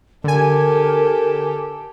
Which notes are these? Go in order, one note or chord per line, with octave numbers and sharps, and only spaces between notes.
D3 G4 A4 A#4 G#5